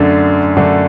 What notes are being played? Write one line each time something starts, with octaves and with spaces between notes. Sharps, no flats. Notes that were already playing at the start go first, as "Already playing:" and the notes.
Already playing: F#2 D3 A3 D4
F#2 D3 A3 D4